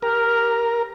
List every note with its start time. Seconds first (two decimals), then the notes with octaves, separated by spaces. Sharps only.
0.02 G4 A#4 F6